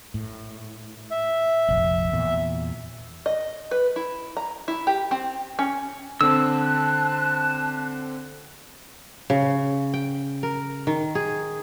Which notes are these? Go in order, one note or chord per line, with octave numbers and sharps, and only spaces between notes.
A2
E5
F1 A#1
E2 A#2 E3
D#5
B4
E4
A#5
E4
G4
C4
C#4
D3 C4 A5 E6 F#6
C#3
G5
A#4
D#3
G#4